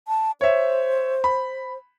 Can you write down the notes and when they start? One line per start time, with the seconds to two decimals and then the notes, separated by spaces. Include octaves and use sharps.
0.08 A5
0.41 C5 C#5 E5
1.24 B5